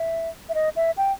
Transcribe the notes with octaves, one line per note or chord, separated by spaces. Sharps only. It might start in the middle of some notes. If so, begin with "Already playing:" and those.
Already playing: E5
E5
D#5
E5
G5